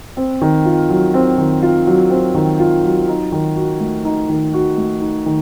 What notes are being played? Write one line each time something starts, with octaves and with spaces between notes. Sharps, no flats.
C4
D#3
F4
F#3
C4
D#3
F4
F#3
C4
D#3
F4
F#3
D#4
D#3
F#4
A3
D#4
D#3
F#4
A3
D#4
D#3